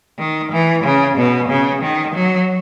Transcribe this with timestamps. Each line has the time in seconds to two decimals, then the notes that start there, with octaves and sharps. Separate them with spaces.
0.18 D#3
0.52 E3
0.84 C#3
1.18 B2
1.49 C#3
1.82 D#3
2.15 F#3